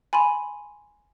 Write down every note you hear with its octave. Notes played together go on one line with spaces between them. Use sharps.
G#5 B5 C6 D#7